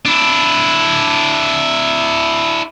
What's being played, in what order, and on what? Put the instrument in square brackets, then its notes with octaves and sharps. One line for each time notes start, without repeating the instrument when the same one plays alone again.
[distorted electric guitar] D4 E4